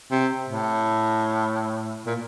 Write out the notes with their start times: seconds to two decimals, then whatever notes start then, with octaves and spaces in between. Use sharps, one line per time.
0.11 C3
0.48 A2
2.05 A#2